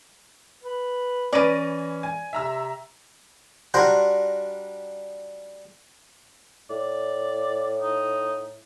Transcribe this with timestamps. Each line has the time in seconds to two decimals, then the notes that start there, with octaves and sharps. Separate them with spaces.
0.64 B4
1.33 E3 C#4 B4 D5 A#6 D#7
2.03 G#5
2.33 C3 E5 A#5 E6
3.74 G3 D4 F#4 A#4 C5
6.70 A2 D5
7.81 D#4